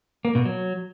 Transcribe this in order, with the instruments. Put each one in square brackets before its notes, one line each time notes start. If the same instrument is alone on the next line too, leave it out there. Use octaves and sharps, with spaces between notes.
[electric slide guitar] A#3
B2
F#3